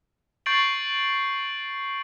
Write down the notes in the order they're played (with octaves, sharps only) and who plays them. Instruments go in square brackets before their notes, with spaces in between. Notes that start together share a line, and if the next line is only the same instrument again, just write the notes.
[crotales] C#6 G6 A6 C7 D7 F#7